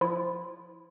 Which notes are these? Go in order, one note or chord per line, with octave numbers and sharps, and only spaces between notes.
F3 E4 F4